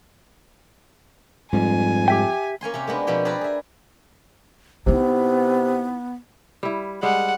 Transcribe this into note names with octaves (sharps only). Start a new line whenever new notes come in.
F2 G#2 G3 G#5
G4 E5 G5
A#3 C#4 G#5 C6
C3 C#4 G4
G#3 A#3 B3 D4
B2 F3 B3 C4 G4
G4 G#4 A#4 B4 D5 A5
G#4 E5
C3 B3 D#4 E4
G3 E4
G3 G#3 F#5